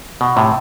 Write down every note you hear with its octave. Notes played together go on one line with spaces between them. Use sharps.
B2
A2 C3